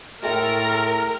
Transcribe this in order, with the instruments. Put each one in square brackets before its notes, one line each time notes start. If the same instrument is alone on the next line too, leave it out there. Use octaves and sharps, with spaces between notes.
[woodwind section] A2 A3 A4 [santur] G#3 D#5 G5 [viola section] A#4 [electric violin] A#5